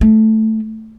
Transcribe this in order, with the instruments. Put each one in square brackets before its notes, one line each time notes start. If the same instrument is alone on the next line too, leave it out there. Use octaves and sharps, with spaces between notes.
[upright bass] A3